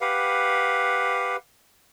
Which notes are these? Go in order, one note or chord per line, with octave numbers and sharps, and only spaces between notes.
G4 B4 F5 F#5